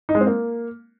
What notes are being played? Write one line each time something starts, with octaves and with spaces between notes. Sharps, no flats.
D#4
G#3
C4
A#3